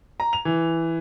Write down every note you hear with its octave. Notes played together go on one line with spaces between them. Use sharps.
A#5
F7
E3